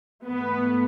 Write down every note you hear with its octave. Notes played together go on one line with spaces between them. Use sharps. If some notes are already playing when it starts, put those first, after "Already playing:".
G#2 E3 A3 B3 B4